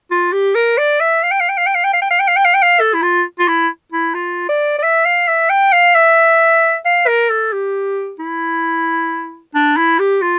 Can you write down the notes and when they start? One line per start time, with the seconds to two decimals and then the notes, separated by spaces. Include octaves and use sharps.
0.11 F4
0.33 G4
0.55 A#4
0.78 D5
1.00 E5
1.23 F5
1.31 G5
1.40 F5
1.49 G5
1.57 F5
1.66 G5
1.75 F5
1.84 G5
1.93 F5
2.02 G5
2.10 F5
2.19 G5
2.28 F5
2.36 G5
2.45 F5
2.54 G5
2.62 F5
2.80 A4
2.94 E4
3.02 F4
3.39 F4
3.48 E4
3.92 E4
4.14 F4
4.49 D5
4.78 D5
4.83 E5
5.05 F5
5.27 E5
5.50 G5
5.72 F5
5.95 E5
6.85 F5
7.07 A#4
7.30 A4
7.53 G4
8.19 E4
9.54 D4
9.77 E4
9.99 G4
10.21 F4